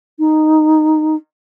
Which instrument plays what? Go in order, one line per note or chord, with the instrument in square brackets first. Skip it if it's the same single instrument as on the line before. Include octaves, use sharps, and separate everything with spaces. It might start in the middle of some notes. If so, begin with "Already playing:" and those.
[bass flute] D#4